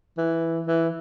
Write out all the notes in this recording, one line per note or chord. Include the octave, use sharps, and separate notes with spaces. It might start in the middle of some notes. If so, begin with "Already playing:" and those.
E3
E3